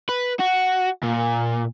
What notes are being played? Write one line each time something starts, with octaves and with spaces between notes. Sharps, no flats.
B4
F#4
A#2